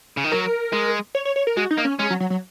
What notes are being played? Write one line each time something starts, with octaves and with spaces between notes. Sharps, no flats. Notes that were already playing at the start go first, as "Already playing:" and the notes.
C#3
D#3
F#3 A#4
G#3
C#5
C#5
C#5
A#4
G#3 F#4
D#4
A#3
C#4
G#3 C#4
F#3
F#3
F#3